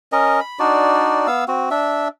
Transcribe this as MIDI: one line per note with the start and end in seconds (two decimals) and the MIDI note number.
0.12 0.40 61
0.12 0.40 70
0.12 0.40 75
0.40 0.59 83
0.59 1.27 62
0.59 1.27 63
0.59 1.27 66
0.59 1.27 74
1.27 1.45 59
1.27 1.45 77
1.27 1.45 88
1.48 1.69 60
1.48 1.69 66
1.71 2.08 62
1.71 2.08 76